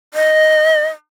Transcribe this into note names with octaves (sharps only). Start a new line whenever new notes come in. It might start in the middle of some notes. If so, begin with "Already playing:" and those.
D#5